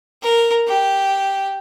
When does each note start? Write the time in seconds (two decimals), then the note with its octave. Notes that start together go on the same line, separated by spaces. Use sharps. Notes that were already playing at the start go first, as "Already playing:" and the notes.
0.22 A#4
0.67 G4